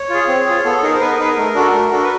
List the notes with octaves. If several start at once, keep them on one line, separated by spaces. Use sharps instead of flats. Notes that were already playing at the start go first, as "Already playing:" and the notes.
Already playing: C#5
F4 G#4
C4
F4 G#4
B3 A4
D#4 G#4 A#4
C5
B3 B4
A#4
D#4 G#4 B4
A#4
A3
D4 F#4 A4
A3
D4 F#4 A4
B4